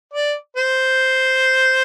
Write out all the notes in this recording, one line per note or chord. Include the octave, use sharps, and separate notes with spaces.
D5
C5